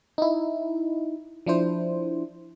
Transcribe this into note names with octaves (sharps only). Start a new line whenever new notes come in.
D#4 E4
F3 D4 E4 C5